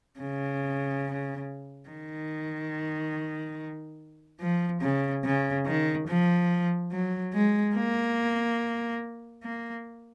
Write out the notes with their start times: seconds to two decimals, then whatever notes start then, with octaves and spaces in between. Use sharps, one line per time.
0.20 C#3
1.89 D#3
4.40 F3
4.81 C#3
5.24 C#3
5.66 D#3
6.07 F3
6.91 F#3
7.33 G#3
7.75 A#3
9.43 A#3